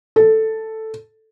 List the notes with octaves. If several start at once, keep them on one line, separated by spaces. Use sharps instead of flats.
A4